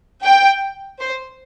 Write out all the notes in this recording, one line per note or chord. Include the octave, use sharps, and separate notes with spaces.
G5
C5